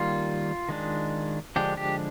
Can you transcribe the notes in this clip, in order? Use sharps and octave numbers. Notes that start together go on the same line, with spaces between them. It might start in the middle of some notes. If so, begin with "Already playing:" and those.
Already playing: D#3 G3 A#3 F4
D#3 G#3 D4
D3 F3 G#3 D4 G4
G4